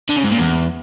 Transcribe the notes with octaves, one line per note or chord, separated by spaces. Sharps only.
D3
C#3
G#2
A#2
E2